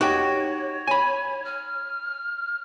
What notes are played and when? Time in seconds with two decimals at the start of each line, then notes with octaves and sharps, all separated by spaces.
0.01 D#4 F#4 G4 C#5 G5
0.88 G#5 B5
1.45 F6